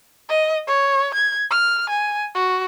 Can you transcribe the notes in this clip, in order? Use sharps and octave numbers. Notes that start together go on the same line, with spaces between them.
D#5
C#5
G#6
F6
G#5
F#4